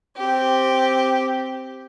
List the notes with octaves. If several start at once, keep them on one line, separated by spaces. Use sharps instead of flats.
C4 G4